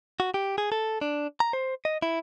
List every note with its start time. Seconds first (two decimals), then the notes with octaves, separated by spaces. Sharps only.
0.20 F#4
0.34 G4
0.58 G#4
0.72 A4
1.01 D4
1.40 A#5
1.53 C5
1.85 D#5
2.02 E4